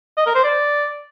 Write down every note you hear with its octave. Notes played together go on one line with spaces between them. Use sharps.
D#5
A#4
C5
D5